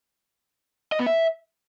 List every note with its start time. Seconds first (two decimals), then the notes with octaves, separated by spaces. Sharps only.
0.92 D#5
0.99 B3
1.07 E5